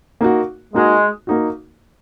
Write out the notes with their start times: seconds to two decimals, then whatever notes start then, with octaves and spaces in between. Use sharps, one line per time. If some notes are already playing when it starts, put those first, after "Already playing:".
0.21 A#3 D#4 F#4
0.74 G#3 A#3 D#4 F#4
1.27 A#3 D#4 F#4